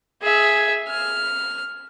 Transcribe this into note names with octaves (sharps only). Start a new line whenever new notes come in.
G#4 E5
F6